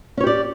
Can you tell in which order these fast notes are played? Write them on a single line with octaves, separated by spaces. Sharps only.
C#4 C#5 G4 D5